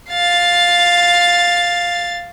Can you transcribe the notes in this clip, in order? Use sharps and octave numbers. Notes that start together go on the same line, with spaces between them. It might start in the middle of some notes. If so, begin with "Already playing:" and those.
F5 A6